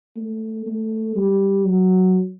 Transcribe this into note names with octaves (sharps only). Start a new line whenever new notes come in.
A3
A3
G3
F#3